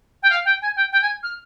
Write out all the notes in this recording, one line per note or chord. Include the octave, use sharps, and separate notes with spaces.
G5
F5
G5
G#5
G5
G5
G#5
F6